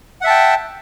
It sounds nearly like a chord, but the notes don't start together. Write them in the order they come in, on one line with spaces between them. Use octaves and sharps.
F#5 E5 A5 G5